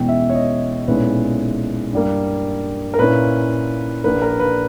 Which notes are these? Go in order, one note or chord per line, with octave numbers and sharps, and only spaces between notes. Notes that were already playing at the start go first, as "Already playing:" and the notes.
Already playing: E2 B2 G#3 C#4 E4 G5
E5
C#5
D#5
B1 A#2 G#3 C#4 E4 B4
G2 G3 A#3
A#4
A#2 A#3 C#4 E4 B4
A#1 A#2 A#3 B4
A#4
B4